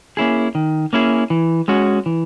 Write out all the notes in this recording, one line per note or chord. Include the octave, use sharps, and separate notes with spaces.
A#3 C#4 E4 G#4
D#3
A#3 C#4 E4 G#4
E3
G#3 C#4 F#4
E3